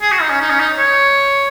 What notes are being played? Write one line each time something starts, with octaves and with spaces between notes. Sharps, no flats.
G#4
F#4
D#4
C#4
D#4
C#4
D#4
C#5